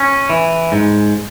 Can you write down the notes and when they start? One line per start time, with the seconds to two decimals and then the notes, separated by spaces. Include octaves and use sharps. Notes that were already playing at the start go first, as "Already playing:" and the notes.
Already playing: C#4
0.30 E3
0.72 G#2